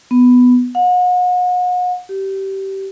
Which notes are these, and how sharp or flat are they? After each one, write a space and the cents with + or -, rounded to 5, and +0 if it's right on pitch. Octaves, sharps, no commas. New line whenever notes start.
B3 +5
F#5 -40
G4 -20